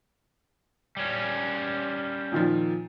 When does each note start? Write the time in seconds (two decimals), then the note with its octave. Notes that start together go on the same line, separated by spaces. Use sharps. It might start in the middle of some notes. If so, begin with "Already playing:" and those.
0.97 G3 C#4
2.32 A#2 D#3 F3